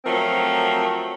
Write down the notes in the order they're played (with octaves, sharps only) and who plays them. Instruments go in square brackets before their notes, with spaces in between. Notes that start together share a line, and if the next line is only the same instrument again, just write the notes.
[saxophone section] F3 F#3 A3 C4 A#4